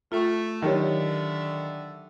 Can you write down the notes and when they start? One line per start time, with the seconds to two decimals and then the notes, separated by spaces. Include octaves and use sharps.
0.12 A3 F4
0.62 D3 D#3 F#3 G4 C#5 D5 E5